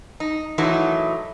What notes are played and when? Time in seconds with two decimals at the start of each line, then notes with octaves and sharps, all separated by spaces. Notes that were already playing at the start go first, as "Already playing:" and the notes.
0.20 D#4
0.58 D#3 E3 F#3 A3 D#4 E4